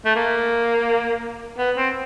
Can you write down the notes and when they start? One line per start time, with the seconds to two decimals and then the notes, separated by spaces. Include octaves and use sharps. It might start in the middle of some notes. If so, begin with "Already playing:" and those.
0.05 A3
0.15 A#3
1.58 B3
1.77 C4